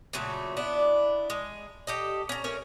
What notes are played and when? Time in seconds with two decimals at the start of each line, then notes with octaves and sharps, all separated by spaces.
0.13 A#2 C#3 F#3 A3
0.57 B3 D4 E4
1.30 G#3
1.87 G4 A4 D#5
2.29 C#4 A#5
2.44 A3 C#4 A#4 C#5